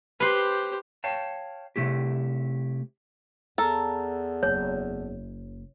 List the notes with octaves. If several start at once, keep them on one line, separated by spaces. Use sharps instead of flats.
G4 B4 C5 C6
C#5 F5 G5 A5
C3 A3 E4 G4
E2 A4 A#4
F#1 C#5